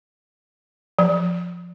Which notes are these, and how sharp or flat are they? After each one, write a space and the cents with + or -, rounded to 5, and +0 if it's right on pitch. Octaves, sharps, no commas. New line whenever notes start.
F3 +5